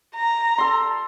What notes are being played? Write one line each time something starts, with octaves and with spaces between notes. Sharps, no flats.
A#5
A4 C6